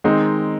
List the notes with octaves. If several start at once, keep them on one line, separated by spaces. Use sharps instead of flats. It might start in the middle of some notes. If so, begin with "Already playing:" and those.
D#3 G#3 C4 D#4